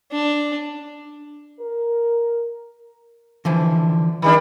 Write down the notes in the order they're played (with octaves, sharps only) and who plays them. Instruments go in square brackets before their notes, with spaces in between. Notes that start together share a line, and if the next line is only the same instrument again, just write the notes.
[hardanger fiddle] D4
[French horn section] A#4
[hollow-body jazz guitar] D3 E3 F3
[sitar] D#3 G3 D4 [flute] B5